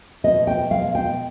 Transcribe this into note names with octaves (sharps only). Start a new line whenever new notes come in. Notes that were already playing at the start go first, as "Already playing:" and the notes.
B2 D#5
G5
G#3 F5
G5